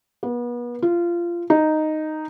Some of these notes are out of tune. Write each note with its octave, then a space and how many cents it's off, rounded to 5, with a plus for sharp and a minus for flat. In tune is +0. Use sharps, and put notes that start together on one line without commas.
B3 -35
F4 -20
D#4 -5